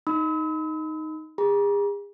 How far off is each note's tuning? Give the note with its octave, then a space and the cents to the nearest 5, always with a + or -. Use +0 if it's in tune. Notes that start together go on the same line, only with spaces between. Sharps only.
D#4 +0 B5 +35 E6 -45
G#4 -40 A#5 +40